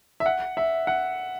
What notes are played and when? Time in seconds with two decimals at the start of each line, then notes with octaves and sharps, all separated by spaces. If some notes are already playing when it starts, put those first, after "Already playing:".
0.20 E5
0.26 F#5
0.57 E5
0.87 F#5